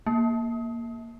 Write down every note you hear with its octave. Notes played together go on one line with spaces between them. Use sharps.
A#3